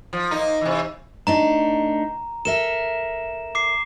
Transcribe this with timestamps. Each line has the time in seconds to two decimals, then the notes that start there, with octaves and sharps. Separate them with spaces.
0.13 F3
0.31 A#3 D#4
0.61 C3 E3
1.27 A3 D4 D#4 A#5
2.45 A4 A#4 E5 E7
3.55 D6 C7